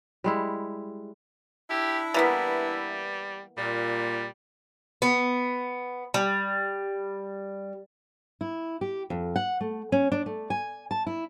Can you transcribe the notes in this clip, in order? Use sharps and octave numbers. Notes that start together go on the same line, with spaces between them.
G3 G#3 E4
D4 E4 G4
E3 G3 A#3 B3
A#2 G3
B3
G3
E4
G4
F2
F#5
A3
C#4
D4
A3
G#5
A5
E4